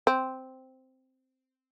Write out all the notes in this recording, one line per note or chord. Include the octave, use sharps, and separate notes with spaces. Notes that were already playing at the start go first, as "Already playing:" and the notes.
C4